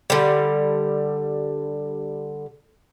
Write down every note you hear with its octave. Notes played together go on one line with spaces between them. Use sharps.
D3 G3